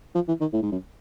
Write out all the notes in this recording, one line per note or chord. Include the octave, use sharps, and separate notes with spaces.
F3
E3
D#3
A2
G#2
F#2